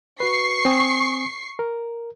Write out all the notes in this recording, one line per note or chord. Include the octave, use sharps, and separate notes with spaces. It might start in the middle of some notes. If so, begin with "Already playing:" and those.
F#4 B4 C#6 C7
C4 G#5 D#6
A#4